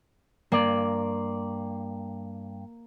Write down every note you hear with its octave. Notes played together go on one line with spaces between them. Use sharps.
G2 A#3 D5